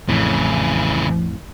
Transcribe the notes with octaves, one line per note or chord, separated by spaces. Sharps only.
A1 F2 A2 C#3 E3